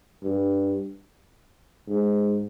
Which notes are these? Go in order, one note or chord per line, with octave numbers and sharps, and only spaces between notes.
G2
G#2